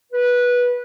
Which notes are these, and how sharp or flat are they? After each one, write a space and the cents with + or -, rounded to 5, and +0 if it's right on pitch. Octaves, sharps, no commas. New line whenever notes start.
B4 -15